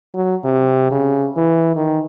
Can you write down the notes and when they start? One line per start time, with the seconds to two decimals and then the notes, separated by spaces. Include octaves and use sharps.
0.14 F#3
0.44 C3
0.91 C#3
1.37 E3
1.76 D#3